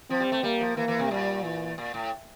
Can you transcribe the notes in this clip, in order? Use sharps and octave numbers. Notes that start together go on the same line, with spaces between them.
F3 C4
G3
A3
G3 A#3
F3
E3 A#3
E3
C3
A#2 G3
E3
A#2
A2